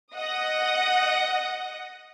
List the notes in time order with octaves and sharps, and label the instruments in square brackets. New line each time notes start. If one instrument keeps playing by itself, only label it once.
[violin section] D#5 F#5 D#6 A#6